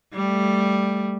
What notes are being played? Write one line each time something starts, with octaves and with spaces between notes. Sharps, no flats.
G3 A3